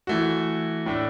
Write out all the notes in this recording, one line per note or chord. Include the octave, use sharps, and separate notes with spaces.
E3 A3 F#4
A2 A3 D4